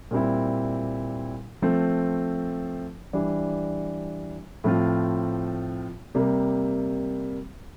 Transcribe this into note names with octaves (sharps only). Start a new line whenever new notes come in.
A#2 G3 C4 E4
F3 A3 C4
E3 G3 D4
A2 F3 C4 F4
C3 G3 A#3